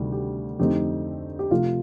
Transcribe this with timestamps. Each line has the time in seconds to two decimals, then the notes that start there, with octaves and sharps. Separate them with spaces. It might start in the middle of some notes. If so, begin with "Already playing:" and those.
Already playing: D2 C3 D#3 G3
0.12 G4
0.59 F2 D3 A3 C4 D#4 G4
1.39 G4
1.51 C3 F3 A3 F4